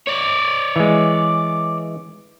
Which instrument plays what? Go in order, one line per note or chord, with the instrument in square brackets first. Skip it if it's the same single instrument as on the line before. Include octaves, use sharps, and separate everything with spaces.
[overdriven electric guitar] C#5 D5
[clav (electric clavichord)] E3 G#3